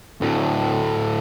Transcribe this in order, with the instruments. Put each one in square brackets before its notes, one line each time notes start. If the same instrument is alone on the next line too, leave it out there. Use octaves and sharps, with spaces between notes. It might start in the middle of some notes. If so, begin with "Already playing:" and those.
[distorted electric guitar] D2 A2